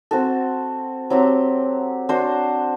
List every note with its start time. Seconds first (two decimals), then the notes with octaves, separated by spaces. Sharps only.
0.11 C4 F#4 A4
1.10 F#3 C4 G4
2.09 D4 F#4 C5